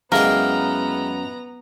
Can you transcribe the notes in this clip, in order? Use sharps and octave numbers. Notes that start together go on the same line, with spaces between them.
F#2 E3 G#3 B3 A#4 F5 G5 A#5